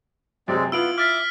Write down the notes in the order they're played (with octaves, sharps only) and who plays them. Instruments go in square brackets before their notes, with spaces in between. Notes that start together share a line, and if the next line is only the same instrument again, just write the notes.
[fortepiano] F#2 C3 [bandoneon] G#3 C4 D5
[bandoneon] B3 [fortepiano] E4 F4 [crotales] E6 D7 F#7
[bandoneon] E5 D6 [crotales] F6 A6 B6